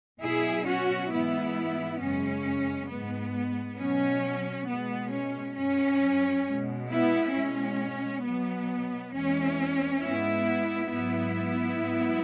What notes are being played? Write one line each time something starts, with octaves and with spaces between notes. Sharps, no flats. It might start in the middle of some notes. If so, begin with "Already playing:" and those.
B2 F#3 E4 G#4
C#4 F#4
G#2 E3 G#3 B3 E4
F#2 C#3 G#3 C#4
G#2 G#3 B3
B2 F#3 C#4
B2 G#3 B3
C#4
F#2 F#3 C#4
G#3
B2
B3 E4
B2 G#3 C#4
B2 F#3 B3
E2 E3 G#3 C#4
G#2 G#3 B3 E4
G#2 F#3 B3 E4
G#2 F#3